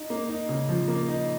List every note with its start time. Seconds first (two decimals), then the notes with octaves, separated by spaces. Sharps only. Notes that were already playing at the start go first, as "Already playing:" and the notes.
Already playing: D#4
0.10 A#3
0.29 D#4
0.49 C#3
0.69 F3
0.88 A#3
1.08 D#4